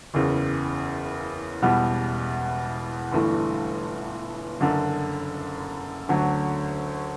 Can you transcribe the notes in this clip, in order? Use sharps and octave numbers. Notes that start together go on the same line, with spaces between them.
F#1 E2 C#3
E1 E2 B2 G3 B3
G1 G2 E3 A3
F#1 F#2 D3
D2 D3 F#3